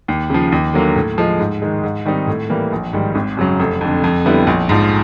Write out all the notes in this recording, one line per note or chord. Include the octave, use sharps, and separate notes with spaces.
D#2
C#3 F3
D#2
D3 F#3 A#3
A2
F3 G#3
G#2
D#3 G#3
G#2
D#3 G3 C4 D#4
A2
E3 G3 A#3
A#1
G#2 D#3 G3
G#1
F#2 C#3 F#3
F1
F2 D3
F2
D3 G3 B3 E4
A#1
G#2 F3